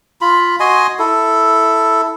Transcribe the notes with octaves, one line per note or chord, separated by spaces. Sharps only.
F4 B5
F#4 D#5 G#5 C6
E4 A4